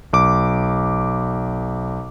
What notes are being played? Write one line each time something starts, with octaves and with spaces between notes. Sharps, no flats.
B1 D6